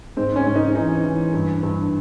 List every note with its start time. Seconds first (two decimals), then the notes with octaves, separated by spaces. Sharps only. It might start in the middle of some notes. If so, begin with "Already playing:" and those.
0.17 G#2 C4
0.36 C#4
0.46 G#2
0.56 D#4
0.75 E3 D#4
1.04 E3
1.34 G2
1.63 G2